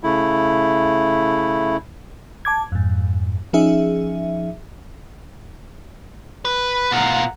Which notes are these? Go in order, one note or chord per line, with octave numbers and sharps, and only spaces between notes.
C#3 A3 E4
A5 D6 G#6
F2 G#2
F3 C#4 D#4 G#4 E5
B4
B2 F4 F#5 A#5